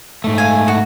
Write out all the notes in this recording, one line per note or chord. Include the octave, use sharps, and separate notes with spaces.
G#2 A3
F5 G#5
F#4